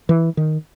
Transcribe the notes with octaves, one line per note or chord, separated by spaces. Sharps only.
E3
D#3